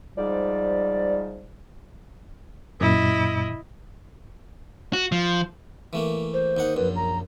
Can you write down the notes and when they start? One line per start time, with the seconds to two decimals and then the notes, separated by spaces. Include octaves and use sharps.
0.17 G#2 F3 G3 D5
2.81 F#2 A#2 E4 D#5
4.93 F#4
5.12 F3
5.93 E3 A3 A#3
6.34 C5
6.57 D#2 D#4 F#5
6.76 A#1 F#2 B4
6.96 A#5